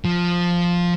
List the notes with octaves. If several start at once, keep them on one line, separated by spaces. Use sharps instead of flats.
F3